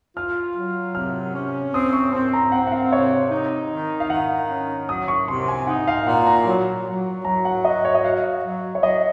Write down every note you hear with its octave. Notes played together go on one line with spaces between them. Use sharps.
F4 F6
F#3
C3 F6
C#4
C4 D#6
C#6
C4 C6
A#5
C4 F#5
F#5
F5
C3 C#5
D#4
D#3
F5
D#3 F#5
C#4
F#3 D#6
C#6
C3 C6
G#5
D#4 F#5
F5
A#2 F#5
A#5
F#3
F#3
F#3 A#5
F#5
F#4 D#5
C#5
D#5
F#4 F5
F#3
C#5
F#3 D#5